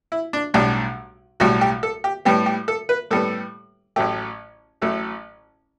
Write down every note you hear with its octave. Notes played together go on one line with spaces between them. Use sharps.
E4
D4
B1 A2 G3 D4
B1 A2 G3 F#4
G4
A4
G4
A2 G3 B3 G4
G4
A4
B4
A2 G3 B3 A4
A1 A2 F#3 A3 G4
A1 A2 F#3 A3 A4